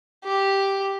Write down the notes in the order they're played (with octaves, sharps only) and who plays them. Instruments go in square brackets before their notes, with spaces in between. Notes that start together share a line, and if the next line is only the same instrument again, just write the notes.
[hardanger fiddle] G4